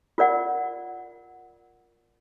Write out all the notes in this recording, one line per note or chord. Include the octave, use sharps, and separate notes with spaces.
F4 A#4 D5 F#5